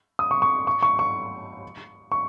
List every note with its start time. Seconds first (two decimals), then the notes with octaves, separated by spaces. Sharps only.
0.19 D#6
0.31 C#6
0.42 C#6
0.67 C#6
0.82 C#6
0.99 C#6
2.12 C#6